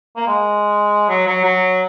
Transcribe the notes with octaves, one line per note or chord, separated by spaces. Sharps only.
A#3
G#3
F#3
F#3
F#3